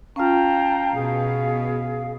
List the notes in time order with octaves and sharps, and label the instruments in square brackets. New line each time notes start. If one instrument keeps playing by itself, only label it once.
[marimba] C#4 F4 [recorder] F5 [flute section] G5 A5 A#5
[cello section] B2 [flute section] G#4